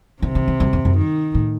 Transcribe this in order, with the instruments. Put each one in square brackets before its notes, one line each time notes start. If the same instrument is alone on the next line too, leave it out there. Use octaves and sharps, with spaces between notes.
[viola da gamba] C3 [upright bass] D#3
[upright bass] D#3
E3
F#2
E2
F#2
[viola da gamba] D#3
[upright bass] A2